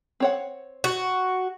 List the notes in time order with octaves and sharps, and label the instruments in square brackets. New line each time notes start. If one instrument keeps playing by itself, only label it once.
[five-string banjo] C4 C#5 F#5
[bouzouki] F#4